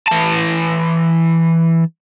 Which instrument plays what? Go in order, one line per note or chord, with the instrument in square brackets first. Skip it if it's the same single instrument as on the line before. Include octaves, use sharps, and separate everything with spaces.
[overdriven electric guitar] E3 A5